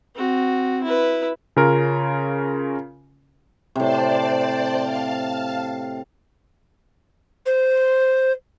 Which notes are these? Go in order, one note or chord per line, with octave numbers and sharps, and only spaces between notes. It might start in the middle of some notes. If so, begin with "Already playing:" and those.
C4 F#4
E4 B4
C#3 C#4 F4 A#4
A2 C3 C5 D5 A5
F5 A5
C5